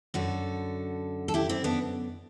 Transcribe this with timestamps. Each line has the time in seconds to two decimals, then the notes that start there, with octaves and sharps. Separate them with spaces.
0.14 F#2 D3 F#4 A4
1.28 A4
1.34 E4 G4
1.49 C4 E4
1.64 B3 D4